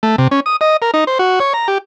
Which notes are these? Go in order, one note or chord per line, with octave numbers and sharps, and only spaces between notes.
A3
C3
C#4
D#6
D#5
A#4
D#4
C5
F#4
C#5
A#5
G4